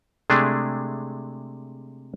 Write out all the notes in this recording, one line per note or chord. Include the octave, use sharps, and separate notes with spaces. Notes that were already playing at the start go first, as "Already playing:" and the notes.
C3 G#3 A3 D4 G#4